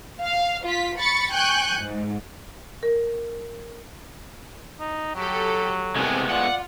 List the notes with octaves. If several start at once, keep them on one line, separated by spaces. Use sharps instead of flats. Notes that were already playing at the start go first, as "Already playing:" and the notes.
F5
F4 B6
B5 C#6 A6 C#7
G5 G#5 C#6 F#6 G6
G#2
A#4
D#4
F#3 G4 A4
C2 C3 G#3 A3 B3 G#5
F4 D5 F#5